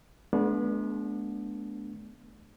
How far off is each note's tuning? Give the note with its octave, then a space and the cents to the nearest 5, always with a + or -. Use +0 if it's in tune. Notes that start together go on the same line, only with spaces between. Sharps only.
G#3 +40 B3 -30 D4 -15